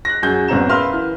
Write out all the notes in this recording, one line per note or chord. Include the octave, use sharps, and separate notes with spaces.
F#6 A#6
F#2 F#4 G#4 G6
F#1 B2 C4 F#5 A#5 E7
A#4 B4 E5 F5 C6 F6
E3